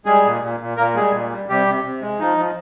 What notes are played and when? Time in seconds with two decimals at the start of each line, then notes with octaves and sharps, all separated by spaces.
0.06 G3 G#3 G#4
0.25 A#2
0.42 A#2
0.60 A#2
0.77 A#2 A#3 A#4
0.95 G3 G#3 G#4
1.13 A#2
1.31 G3
1.49 C3 G3 G4
1.67 C3
1.84 C3
2.02 G#3
2.19 F3 D#4
2.38 F3